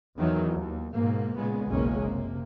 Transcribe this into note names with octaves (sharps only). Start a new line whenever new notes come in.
E2 D#3 E3 F#3
D#2
G#2 B2 A#3
A#2 C#3 G#3 B3
F#1 B1 E2 G#3 A#3 C#4
C3 A#3